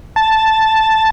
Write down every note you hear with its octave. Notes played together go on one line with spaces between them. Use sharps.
A5